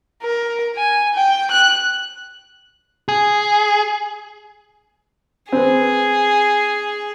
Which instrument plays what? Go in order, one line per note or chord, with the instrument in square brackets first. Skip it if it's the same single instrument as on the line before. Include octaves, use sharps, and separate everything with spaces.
[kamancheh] A#4
G#5
G5
F#6
[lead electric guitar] G#4
[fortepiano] C4 B4 [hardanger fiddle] G#4